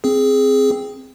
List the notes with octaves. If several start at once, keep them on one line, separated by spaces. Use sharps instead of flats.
C4 G#4